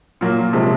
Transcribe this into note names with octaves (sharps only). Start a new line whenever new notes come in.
A#2 F#3 A#3
C3 F3 G#3